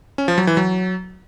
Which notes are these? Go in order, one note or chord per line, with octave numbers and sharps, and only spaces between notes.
C#4
F3
F#3
E3
F#3